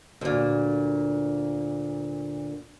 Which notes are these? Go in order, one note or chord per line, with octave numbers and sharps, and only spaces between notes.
D2 A#2